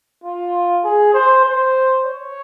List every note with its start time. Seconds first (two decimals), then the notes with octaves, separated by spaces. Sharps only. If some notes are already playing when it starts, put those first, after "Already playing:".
0.24 F4
0.84 G#4
1.14 C5
1.45 C5
2.06 C#5